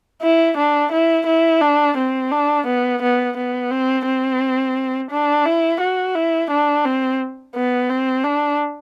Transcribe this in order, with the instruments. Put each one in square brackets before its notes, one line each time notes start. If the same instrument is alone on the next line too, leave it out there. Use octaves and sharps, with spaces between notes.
[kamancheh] E4
D4
E4
E4
D4
C4
D4
B3
B3
B3
C4
C4
D4
E4
F#4
E4
D4
C4
B3
C4
D4